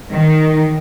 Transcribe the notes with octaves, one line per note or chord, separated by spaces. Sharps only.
D#3